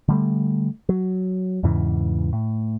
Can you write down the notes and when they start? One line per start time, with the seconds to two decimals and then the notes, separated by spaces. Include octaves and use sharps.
0.08 D3 G3 A3
0.89 F#3
1.63 E2 G#2 C#3 E3
2.33 A2